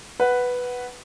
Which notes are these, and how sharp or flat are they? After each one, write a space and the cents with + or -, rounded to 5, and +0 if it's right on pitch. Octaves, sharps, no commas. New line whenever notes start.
B4 +0 F#5 +0